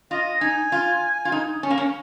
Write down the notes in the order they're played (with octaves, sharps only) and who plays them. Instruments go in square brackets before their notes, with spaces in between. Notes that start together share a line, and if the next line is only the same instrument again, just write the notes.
[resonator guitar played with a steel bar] F4 [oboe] D#5
[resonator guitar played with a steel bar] D#4 [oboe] G#5
[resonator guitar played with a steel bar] F4
F4
D#4
C#4
A#3
C#4